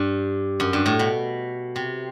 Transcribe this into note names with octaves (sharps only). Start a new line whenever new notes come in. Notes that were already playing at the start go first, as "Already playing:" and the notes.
Already playing: G2
F#2
G2
A2
B2
C3